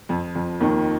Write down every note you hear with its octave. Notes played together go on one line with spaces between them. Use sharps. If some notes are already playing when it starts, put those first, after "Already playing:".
F2 F3
F2 F3
D#2 D#3